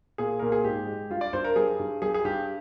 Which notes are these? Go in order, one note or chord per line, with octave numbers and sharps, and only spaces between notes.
A#2 G#4
A#2 A#4
G#4
G#2 G4
G#3
G2 F4
D5
G2 C5
A#4
G3 G#4
G2
G3 G#4
G#4
G2 G4